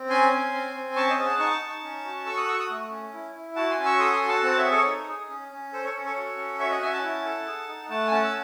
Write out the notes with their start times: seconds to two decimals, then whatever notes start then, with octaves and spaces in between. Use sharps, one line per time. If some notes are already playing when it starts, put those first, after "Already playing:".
Already playing: C4
0.10 C#4 G#5 C6
0.31 C#4
0.53 C4
0.74 C4
0.96 C#4 A5 C#6
1.10 C5 D#5
1.18 G#4
1.25 F#5 A5
1.39 D#4 A5 C#6
1.61 D#4
1.83 C#4
2.04 F#4
2.26 A4 C#6 E6
2.37 D#6 F#6
2.47 F#4 C#6 E6
2.59 D#6 F#6
2.69 A3
2.91 C#4
3.13 E4
3.35 E4
3.56 F#4 F#5 A5
3.71 G#5 C6
3.78 C#4
3.85 C#6 E6
3.99 A4 C6 D#6
4.14 G#5 C6
4.21 F#4
4.28 F#5 A5
4.43 C4 F#5 A5
4.57 C#5 E5
4.65 G#4
4.72 A4 C#5
4.86 D#4
5.08 G#4
5.29 C#4
5.52 C#4
5.73 A4 C5
5.84 A4 C#5
5.95 C#4
6.05 A4 C#5
6.17 F#4
6.38 C#4
6.59 F#4 C#5 E5
6.71 D#5 F#5
6.81 C#4 E5 G#5
6.92 F#5 A5
7.03 E4
7.25 A4
7.47 G#4
7.68 D#4
7.89 A3 F#5 A5
8.07 G#5
8.11 C#4 F#5 A5
8.24 E6